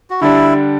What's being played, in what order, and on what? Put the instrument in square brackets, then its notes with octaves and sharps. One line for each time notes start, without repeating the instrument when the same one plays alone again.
[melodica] F#4
[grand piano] D3 G3 D4 [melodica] E4